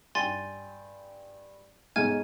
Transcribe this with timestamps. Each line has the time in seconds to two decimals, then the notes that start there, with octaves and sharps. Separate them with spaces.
0.15 G2 G5 G#5 C6 A6
1.96 B1 G#2 B2 G#5 F6 G#6